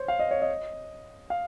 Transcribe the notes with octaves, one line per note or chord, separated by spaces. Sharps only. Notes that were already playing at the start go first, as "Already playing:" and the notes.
Already playing: C5 C#5
F5
D#5
C#5
D#5
F5